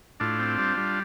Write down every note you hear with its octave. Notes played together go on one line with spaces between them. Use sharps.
A2 D4 F4
C4
G3
G3